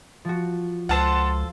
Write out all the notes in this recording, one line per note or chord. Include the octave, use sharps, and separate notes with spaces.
F3 F#4
C#2 F4 A4 C5 F#5 A5